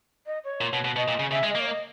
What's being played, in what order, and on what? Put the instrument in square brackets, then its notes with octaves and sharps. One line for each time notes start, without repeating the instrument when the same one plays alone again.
[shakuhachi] D#5
C#5
[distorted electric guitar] A#2
B2
B2
[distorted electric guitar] B2 [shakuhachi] D#5
[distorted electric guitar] A#2
C#3
[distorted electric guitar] C#3 [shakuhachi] E5
[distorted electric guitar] G#3
[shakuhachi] D#5
[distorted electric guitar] A#3 [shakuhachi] C#5
[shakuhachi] D#5